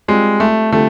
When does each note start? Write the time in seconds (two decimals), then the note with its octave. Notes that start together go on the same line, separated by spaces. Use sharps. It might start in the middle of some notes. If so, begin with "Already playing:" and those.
0.08 G3 G#3 C4 F4
0.40 A3
0.72 D3 G3 A3 C4 F4 A4